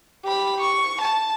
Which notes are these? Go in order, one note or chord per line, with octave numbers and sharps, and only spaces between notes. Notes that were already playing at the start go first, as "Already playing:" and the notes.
G4 B5
C#6
A5